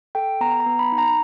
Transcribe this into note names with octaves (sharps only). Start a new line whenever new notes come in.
A4 G5
B3 A#5
A#5
B3
B5
D#4
A#5